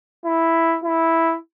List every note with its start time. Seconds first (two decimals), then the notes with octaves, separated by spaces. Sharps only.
0.25 E4
0.84 E4